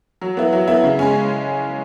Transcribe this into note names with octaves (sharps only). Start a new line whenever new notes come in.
F#3
B3 E4
F#3
B3 E4
C#3
G#3 C#4